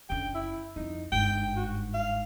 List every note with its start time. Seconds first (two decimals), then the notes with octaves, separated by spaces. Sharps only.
0.10 F#1 D3 G5
0.34 E4
0.76 F2 D#4 E4
1.12 G1 G#2 G5
1.56 F#4
1.94 F5